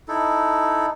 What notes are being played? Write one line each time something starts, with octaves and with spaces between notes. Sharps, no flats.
D#4 E4 A4